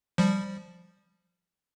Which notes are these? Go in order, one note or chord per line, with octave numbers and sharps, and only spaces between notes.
F3 G3